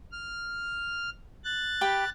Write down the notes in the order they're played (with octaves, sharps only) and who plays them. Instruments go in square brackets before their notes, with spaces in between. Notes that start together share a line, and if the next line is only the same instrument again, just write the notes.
[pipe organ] F6
F#6 A6
[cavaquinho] G4 G5 B5